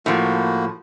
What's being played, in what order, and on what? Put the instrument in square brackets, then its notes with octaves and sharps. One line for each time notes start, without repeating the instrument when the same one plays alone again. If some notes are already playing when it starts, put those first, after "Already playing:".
[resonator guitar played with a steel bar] A2 F3 [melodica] A#3 F#4